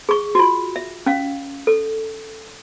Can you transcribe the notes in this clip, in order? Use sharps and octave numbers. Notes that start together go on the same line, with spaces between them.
G#4 C#6
F4 F#4
E5
C#4 F5
A4